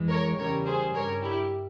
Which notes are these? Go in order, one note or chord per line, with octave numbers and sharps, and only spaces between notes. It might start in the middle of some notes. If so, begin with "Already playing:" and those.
Already playing: F2 E3 G#3
A#4 C#5
E2 C#3 G3 A#4 C#5
G#4 C5
G2 G3 A#4 C#5
E4 G4